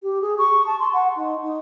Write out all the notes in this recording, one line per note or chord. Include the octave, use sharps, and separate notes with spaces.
G4
G#4
C#6
A5
C6
F#5
D#4
D#4